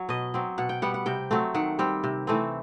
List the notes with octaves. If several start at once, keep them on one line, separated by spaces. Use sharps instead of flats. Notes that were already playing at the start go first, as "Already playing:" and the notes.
Already playing: F#3
B2 D#5
F#3 C4
B2 F#5
G5
G3 B3 F#5
F#5
C3 G5
F#3 A3 C4
D#3 F#5
G3 C4
C3
E3 A3 C4